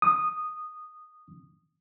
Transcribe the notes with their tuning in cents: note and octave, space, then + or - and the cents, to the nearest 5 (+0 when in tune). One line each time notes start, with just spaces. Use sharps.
D#6 -10